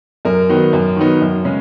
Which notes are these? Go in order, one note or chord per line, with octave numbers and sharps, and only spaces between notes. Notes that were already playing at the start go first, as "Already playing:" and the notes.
F#2 A#4
D#3 F#3 B3 D#4
F#2
D#3 F#3 B3 D#4
F#2
C#3 G#3 C#4